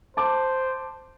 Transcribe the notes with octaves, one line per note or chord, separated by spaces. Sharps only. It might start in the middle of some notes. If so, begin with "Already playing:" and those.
C5 A5 D6